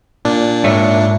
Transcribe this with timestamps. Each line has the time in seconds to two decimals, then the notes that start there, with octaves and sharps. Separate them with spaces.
0.25 A#2 D4
0.64 G#2 C#5 E5